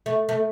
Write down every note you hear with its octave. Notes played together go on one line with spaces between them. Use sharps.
A3
A3